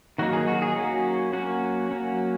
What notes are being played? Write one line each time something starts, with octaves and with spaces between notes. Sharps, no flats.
D#3 F#3 A#3 D#4 F#4
G#4
F#4
G#4
F#3 A#3 C#4 F#4
F#3 A#3 C#4 F#4
F#3 A#3 C#4